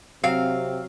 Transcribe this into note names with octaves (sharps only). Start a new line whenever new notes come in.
C3 F#3 C4 F5